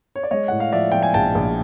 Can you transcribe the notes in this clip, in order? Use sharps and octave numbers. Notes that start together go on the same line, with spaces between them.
C#5
D5
G#3 C#5 D#5
A2 F#5
F5
F3 D5 E5
F3 G5
G#5
A#1 G5 A5
A#1